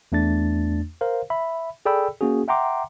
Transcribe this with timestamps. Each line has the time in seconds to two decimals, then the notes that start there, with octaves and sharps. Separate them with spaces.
0.12 E2 A3 D4 A6
1.01 A#4 C5 F5
1.30 E5 B5
1.86 G#4 A4 D5 G5 B5 E6
2.21 A#3 C#4 F#4 G#4
2.48 E5 F#5 G5 A#5 C6 D6